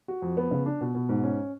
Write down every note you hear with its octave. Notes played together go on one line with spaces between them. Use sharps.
F#4
F2
B3
C#3
D4
B2
B2
G#2
C#4